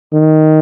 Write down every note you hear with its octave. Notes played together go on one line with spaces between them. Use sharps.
D#3